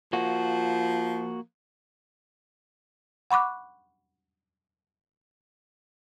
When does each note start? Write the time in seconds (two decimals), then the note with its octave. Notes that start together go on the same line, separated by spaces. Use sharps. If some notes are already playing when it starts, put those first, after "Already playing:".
0.13 F3 A#3 F#4
3.31 F#5 B5 C#6 D6 F#6